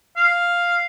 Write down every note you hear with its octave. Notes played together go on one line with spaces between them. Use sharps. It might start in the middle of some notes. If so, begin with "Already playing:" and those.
F5